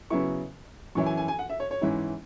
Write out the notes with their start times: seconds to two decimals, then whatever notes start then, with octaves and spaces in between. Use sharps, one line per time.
0.10 C#3 F#3 B3 E4 C#6
0.95 F#2 E3 C#4 E4 C#6
1.06 G#5
1.17 G#5
1.28 G#5
1.39 F#5
1.49 E5
1.60 C#5
1.71 C#5
1.82 G#2 E3 C#4 E4